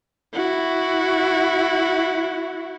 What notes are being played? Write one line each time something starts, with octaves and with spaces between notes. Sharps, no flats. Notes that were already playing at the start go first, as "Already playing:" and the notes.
E4 F#4